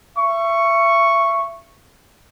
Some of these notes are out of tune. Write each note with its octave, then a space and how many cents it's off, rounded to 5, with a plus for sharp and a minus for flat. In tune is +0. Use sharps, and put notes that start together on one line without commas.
E5 +30 C#6 +0